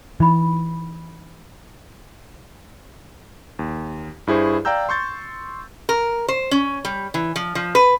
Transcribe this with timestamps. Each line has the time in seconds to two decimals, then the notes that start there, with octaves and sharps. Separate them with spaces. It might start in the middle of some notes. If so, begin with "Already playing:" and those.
0.20 E3 D#4 B5
3.59 D#2
4.27 G2 E4 G#4 C5 C#6
4.65 D5 F5 G5 A#5 E6 G6
4.89 C6 C#6 G6 A6
5.89 A#4
6.28 C5
6.51 C#4
6.85 G3
7.14 E3
7.36 F3
7.55 F3
7.75 B4